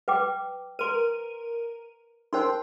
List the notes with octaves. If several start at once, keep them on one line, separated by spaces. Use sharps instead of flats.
B4 G5 D6
A#4 B4 C6 D#7
D#4 A#4 C5 G5 C6